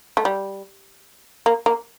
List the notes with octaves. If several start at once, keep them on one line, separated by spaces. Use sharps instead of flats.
A3
G3
A#3
A#3